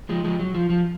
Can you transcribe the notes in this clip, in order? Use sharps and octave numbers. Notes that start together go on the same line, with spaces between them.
F3 G#3
F3 G#3
F#3
F3
F3